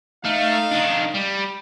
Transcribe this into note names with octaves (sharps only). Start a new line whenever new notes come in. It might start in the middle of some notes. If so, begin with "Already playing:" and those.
A3 D#4 F5
D#3 D4
G3